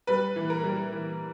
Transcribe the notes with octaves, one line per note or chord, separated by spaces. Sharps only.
G3 B4
E3
A#4
G3
E3